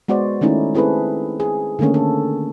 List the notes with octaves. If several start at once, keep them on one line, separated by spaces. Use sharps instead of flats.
G#3 B3 F#4 C5 D5
D#3 A3 C#4 D#4 E4
C4 E4 G#4 A4 B4
G#4
D3 D#3 A3 A#3 C#4
A4